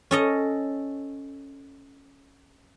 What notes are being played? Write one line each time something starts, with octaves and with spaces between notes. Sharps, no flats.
C#4 A4 D#5